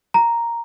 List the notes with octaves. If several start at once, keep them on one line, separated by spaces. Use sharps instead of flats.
A#5